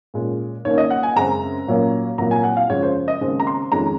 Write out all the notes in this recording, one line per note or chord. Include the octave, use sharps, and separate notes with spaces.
A#2 G#3 C#4
D#2 D#3 A#3 C#4 C#5
D#5
F#5
G#5
F#2 C#3 G#3 C4 A#5
A#2 F#3 A#3 C#4
C2 A#2 F#3 A#3 A#5
G#5
F#5
F5
F#2 C#3 F3 G#3 C#5
C5
D#5
D#2 C#3 G#3 C4
A#5
C6
F2 D#3 G#3 C#4 A#5